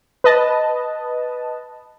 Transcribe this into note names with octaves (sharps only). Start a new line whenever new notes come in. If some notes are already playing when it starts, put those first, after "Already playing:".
B4 D#5 A5